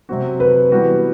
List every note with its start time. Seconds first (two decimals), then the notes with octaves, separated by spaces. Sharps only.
0.09 C3 F#3 C4 F#4
0.40 B4
0.72 E3 G3 B3 F#4